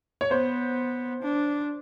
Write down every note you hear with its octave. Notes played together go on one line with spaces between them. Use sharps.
C#5
B3 C5
D4